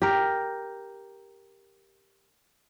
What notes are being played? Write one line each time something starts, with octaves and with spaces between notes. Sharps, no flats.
G4 A#4